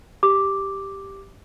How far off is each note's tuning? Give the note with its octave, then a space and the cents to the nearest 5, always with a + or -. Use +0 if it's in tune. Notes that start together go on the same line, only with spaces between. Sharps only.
G4 +0 D6 +0